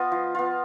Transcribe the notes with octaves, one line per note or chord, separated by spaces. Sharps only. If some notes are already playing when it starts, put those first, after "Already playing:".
Already playing: B3 F4 D#5
F3
B3 F4